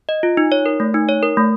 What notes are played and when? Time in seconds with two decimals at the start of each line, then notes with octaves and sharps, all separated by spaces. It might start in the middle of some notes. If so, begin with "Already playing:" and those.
0.09 D#5
0.23 F4
0.37 D#4
0.52 C#5
0.66 A#4
0.80 A3
0.94 D#4
1.09 C#5
1.23 A#4
1.37 A3